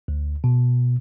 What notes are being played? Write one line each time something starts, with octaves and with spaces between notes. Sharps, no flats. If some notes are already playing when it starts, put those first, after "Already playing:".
D2
B2